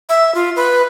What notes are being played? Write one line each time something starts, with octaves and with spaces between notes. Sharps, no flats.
E5
F4
B4